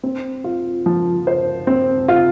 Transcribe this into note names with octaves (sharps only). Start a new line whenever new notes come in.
C4
F4
F3
C5
C4
F4